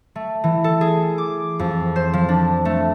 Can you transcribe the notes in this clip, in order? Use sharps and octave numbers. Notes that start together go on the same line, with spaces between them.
A3
E3
A4
G#4
D6
F2
C5
F3
D4
A3